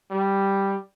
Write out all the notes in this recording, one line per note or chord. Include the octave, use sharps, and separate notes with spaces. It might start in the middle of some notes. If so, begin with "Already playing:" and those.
G3